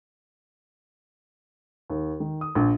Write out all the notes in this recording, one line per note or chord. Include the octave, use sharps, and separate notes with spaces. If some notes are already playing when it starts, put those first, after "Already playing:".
D#2
D#3
D#6
A#1